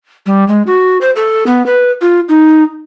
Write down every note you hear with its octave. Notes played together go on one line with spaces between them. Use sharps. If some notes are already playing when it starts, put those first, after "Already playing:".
G3
G#3
F#4
C5
A4
B3
B4
F4
D#4